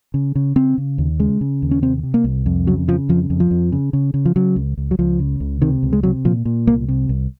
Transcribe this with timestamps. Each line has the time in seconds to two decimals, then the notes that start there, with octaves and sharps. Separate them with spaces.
0.14 C#3
0.35 C#3
0.56 C#3 C4
0.78 C#3
0.98 D#2
1.19 C#3 G#3
1.41 C#3
1.62 D#2
1.71 C#4
1.82 C3 C4
2.03 C3
2.14 A#3
2.24 C2
2.46 F2
2.67 C#3 F#3
2.88 C#3 F3
3.09 F2 F3
3.30 F2
3.40 F3
3.51 F2
3.72 C#3
3.93 C#3
4.14 C#3
4.25 F3
4.36 C#3 F#3
4.56 C#2
4.77 C#2
4.91 F#3
4.99 C#2 F3
5.20 C#3
5.40 C#2
5.62 C3 D#3
5.83 C#2
5.93 G#3
6.03 C3 F#3
6.25 A#2 F3
6.45 A#2
6.67 C2 A#3
6.88 C3
7.09 C2